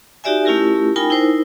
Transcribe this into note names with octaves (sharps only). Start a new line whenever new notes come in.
D#4 F#4 G4 D5 E5 G#5
A3 C#4 E4 F4 G4 A#4
D#4 F4 A#4 G5 G#5 B5
D#4 E4 A#4 C5